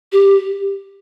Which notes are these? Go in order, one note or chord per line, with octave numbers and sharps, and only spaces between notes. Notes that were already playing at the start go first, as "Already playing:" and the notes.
G4